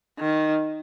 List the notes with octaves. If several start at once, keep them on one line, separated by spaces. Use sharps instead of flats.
D#3